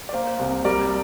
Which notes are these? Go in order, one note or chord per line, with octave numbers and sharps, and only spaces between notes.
D5
A#3 C5 F5
C2
G3 A#4 D5